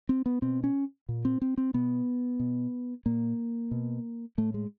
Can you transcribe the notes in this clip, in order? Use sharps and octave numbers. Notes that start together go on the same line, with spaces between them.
C4
B3
B2 C4
C#4
A#2
C4
C4
C4
B2 B3
B2
A#2 A#3
B2
A2 A3
G#3